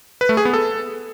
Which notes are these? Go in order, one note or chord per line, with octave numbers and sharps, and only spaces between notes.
B4
A3
G#4
B3
A4